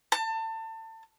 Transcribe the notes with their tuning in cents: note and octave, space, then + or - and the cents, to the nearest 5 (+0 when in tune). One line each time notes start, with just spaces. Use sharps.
A5 +30